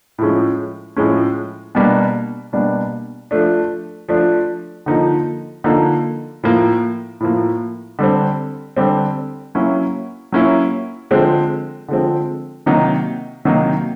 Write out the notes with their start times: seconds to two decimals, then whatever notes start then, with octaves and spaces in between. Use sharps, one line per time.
0.18 A2 F3 G#3 C#4
0.97 A2 F3 G#3 C#4
1.75 B2 G3 A#3 D4
2.53 B2 G3 A#3 D4
3.31 F3 A3 D4
4.09 F3 A3 D4
4.86 D3 F3 A#3 D#4
5.64 D3 F3 A#3 D#4
6.43 A2 F3 A#3
7.20 A2 F3 A#3
7.99 D3 G3 C4
8.77 D3 G3 C4
9.55 F#3 A#3 C#4 E4
10.32 F#3 A#3 C#4 E4
11.11 D3 F3 G#3 C4
11.88 D3 F3 G#3 C4
12.66 C3 D#3 F#3 A#3 D#4
13.45 C3 D#3 F#3 A#3 D#4